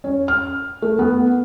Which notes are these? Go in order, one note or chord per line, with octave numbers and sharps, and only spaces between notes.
C#4
F6
A3
B3